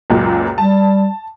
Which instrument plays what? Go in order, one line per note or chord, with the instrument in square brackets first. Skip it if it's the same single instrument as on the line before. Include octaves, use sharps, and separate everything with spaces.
[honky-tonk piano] C#2 F#2 A#2
[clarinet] G3 [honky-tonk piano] A5